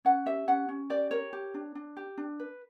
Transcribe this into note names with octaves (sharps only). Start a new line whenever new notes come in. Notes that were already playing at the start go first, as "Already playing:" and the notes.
C#4 F#5
G4 E5
C#4 F#5
C#4
G4 D5
A#4 C#5
G4
D4
D4
G4
D4
B4